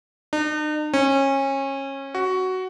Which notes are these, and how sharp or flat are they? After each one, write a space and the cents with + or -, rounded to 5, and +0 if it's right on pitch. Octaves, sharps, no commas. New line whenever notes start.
D#4 -45
C#4 -25
F#4 +10